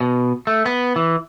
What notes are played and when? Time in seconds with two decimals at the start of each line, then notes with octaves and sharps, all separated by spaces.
0.01 B2
0.47 A3
0.66 B3
0.96 E3